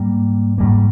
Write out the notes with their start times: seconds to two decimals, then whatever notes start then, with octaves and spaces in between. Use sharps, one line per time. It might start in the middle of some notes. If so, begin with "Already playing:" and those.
Already playing: G#2 G3 A#3
0.58 G#2 G3 A#3